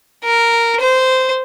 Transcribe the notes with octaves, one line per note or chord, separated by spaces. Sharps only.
A#4
C5